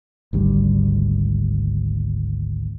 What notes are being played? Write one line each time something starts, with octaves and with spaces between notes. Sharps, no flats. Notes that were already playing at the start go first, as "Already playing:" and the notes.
G#1 D2 G3